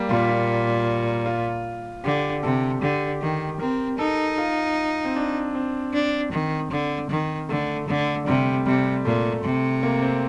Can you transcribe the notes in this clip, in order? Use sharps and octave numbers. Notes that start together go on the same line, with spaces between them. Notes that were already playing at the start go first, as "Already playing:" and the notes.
Already playing: G3 A#3
A#2 F4
F4
F4
D3 G4
C3 A4
D3 G4
D#3 G4
C4 A#4
D#4 A4
F4
C4
D4
C4
D4
D#3
D3
D#3
D3 A3
D3 A3
C3 G3
C3 G3
A#2 A3
C3
A#3
C4